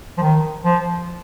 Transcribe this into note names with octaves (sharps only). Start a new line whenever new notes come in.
F3
D#3
F3